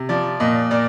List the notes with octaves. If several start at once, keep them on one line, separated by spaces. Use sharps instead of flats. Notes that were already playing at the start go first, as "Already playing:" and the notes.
Already playing: C3
F3 D5
A#2 D#5
A#2 D5